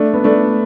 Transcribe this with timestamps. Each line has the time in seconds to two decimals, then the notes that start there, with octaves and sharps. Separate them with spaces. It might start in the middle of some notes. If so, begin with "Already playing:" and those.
Already playing: A3 D4
0.14 B3
0.24 A3 D4